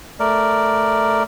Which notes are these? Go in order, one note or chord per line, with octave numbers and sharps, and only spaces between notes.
A3 A#4 D5